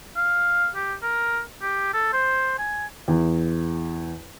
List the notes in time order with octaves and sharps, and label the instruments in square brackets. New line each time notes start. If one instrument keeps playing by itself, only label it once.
[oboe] F5
G4
A#4
G4
A4
C5
G#5
[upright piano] E2